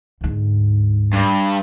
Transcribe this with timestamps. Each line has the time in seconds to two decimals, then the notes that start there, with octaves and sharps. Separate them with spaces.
0.21 D2 G#2
1.13 G2